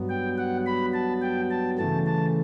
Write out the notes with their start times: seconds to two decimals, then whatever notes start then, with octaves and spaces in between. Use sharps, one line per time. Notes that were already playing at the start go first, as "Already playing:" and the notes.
Already playing: G2 F#3 B3
0.09 G5
0.38 F#5
0.66 B5
0.93 A5
1.22 G5
1.50 A5
1.78 C#3 E3 A3 A5
2.06 A5